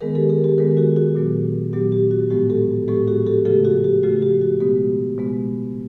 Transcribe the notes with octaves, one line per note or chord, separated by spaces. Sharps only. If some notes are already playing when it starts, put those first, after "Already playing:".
D#3 G#3 B3 G#4 A#4
G4 A4
G#4 A#4
G4 A4
D#3 G#3 B3 G#4 A#4
F#4 G#4
F#4 G#4
A#2 F#3 B3
A#2 F#3 B3 G4
G4
F#4
A2 F3 G#3 B3 G4
G4 A4
A2 F3 G#3 B3 G4 A4
F#4 G#4
G4 A4
C#3 F3 A3 G4 A4
F#4 G#4
G4
C#3 F3 A3 F#4
G4
F#4
B2 G#3 B3 G4
B2 G#3 B3